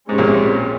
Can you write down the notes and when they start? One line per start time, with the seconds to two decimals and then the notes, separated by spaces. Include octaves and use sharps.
0.08 G#2 G#3 C#4 G4 C#5
0.18 A#1 A#2
0.27 C3